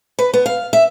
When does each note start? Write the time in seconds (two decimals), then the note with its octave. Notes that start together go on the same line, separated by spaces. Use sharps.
0.19 B4
0.34 B3
0.46 F5
0.73 E5